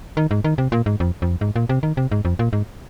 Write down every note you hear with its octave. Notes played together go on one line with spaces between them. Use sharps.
D#3
G#2
D#3
C3
A#2
G#2
F2
F2
G#2
A#2
C3
D#3
C3
G#2
F2
A#2
G#2